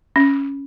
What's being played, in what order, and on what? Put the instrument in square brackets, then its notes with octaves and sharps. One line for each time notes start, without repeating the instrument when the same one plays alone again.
[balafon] C#4